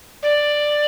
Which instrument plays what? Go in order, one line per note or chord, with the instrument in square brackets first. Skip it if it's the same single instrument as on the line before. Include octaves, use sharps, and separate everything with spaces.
[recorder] D5